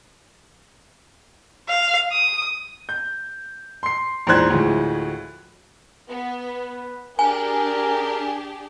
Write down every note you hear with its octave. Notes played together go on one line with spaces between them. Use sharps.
F5
D#6
G6
C6 C7
A#1 E2 G#2 C5 F#6 G#6
D2 A2 F3 G#3
B3 B4
D4 G4 G#4 A#4 G#5